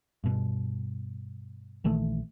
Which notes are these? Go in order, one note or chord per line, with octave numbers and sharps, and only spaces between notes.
G2 B2
A#1 D#3 E3 A3